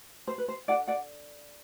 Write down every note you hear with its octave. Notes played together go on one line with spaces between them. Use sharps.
C5
B4
C5
D4 F#4 A4 D5 F#5
D5 F#5